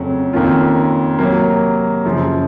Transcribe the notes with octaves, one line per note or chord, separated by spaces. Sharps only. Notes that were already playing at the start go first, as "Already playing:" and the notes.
Already playing: F2 C#3 F#3 A3 C#4
F2 D#3 A#3 C#4 F4
C3 F#3 A#3
F#2 C#3 F3